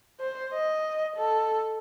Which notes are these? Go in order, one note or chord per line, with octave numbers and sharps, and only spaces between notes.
C5
D#5
A4